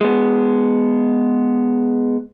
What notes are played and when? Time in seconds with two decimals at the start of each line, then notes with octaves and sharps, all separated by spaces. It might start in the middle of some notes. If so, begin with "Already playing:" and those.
0.01 G#3 B3